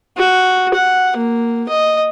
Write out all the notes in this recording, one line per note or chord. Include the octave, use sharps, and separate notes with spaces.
F#4
F#5
A#3
D#5